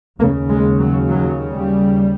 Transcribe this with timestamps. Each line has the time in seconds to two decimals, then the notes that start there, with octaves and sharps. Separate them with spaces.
0.21 D#2 A#3
0.25 C#3
0.50 G#3
0.79 F#3
1.08 F#3
1.52 G3